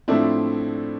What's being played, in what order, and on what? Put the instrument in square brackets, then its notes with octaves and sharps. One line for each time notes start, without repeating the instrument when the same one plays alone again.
[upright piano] A2 F3 A3 C4 D4 E4